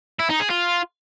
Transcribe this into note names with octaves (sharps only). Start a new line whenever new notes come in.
E4
D#4
G#4
F4